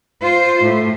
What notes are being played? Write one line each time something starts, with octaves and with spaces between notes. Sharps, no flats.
F4 C5
A2